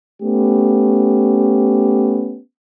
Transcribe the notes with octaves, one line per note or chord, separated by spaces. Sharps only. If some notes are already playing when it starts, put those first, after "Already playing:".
A3 B3 C#4 G4